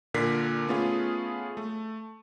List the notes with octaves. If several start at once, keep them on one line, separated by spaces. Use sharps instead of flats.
A#2 D3 A#4 B6 C7
A3 B3 C#4 F4 G#4
A3